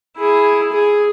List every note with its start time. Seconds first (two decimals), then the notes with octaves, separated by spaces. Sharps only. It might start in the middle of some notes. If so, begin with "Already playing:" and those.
0.17 E4 G#4
0.72 G#4